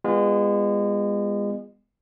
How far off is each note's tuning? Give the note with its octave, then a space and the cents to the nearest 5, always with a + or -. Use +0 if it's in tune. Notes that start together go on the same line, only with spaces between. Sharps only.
G#3 -30 B3 +0 F4 -10